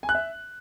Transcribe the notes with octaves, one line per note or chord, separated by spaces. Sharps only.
G#5
F#6
E5